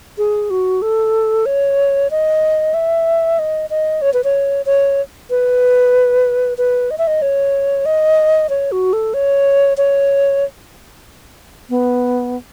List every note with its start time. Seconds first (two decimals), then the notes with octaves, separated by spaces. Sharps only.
0.18 G#4
0.50 F#4
0.82 A4
1.46 C#5
2.11 D#5
2.74 E5
3.39 D#5
3.70 D#5
4.02 C#5
4.14 B4
4.24 C#5
4.66 C#5
5.30 B4
6.58 B4
6.91 D#5
6.98 E5
7.07 D#5
7.22 C#5
7.86 D#5
8.50 C#5
8.72 F#4
8.93 A4
9.14 C#5
9.77 C#5
11.70 B3